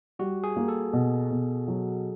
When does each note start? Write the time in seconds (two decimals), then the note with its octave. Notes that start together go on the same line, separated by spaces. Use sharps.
0.19 G3 F#4
0.44 G#4
0.56 A#3
0.68 A4
0.93 B2
1.31 B2
1.68 F#3